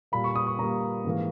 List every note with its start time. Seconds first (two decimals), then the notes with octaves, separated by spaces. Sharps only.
0.12 A#2 G3 A#3 B5
0.24 C#6
0.35 D#6
0.47 C#6
0.59 A#2 G3 A#3 A#5
1.04 G#2 E3 A#3